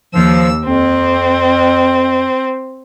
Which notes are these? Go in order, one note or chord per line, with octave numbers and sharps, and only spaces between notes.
D#2 F3 E6
F2 C4